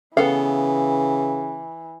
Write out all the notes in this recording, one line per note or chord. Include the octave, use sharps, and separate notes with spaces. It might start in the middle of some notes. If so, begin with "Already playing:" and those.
C#3 E3 B3 A4 F5